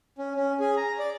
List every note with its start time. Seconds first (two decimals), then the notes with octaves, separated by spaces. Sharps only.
0.18 C#4
0.36 C#4
0.60 G#4
0.77 A#5
0.99 D5